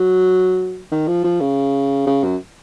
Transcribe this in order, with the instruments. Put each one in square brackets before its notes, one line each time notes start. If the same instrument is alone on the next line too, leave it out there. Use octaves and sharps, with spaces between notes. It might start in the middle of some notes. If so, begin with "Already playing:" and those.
Already playing: [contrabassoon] F#3
D#3
F3
F3
C#3
C#3
F#2